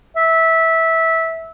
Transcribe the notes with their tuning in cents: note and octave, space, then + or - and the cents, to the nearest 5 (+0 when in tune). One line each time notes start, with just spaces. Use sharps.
E5 -15